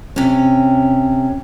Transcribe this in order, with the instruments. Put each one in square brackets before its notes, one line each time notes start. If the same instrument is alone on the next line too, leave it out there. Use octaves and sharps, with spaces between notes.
[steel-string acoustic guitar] C3 C#4